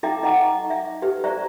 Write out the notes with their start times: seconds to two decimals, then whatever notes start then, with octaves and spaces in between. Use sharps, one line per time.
0.03 D#4 A4 E5 G5 A#5 D6
0.23 D#4 D#5 F#5 A#5 C#6 D6
0.70 E5
1.02 G4 A4 B4
1.24 C5 D5 E5 A#5 C#6